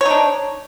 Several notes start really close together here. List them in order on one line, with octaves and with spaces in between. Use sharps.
C#5 D#4 D4